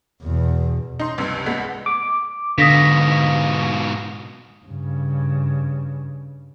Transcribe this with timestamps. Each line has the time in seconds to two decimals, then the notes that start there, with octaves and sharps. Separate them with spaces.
0.23 E2 B2
0.99 D#4 C6
1.18 C#2 G2 C3
1.46 C2 G#3 B3
1.86 D6
2.58 G#2 B2 D3 F5 D#6 A#6 B6
4.65 G2 C#3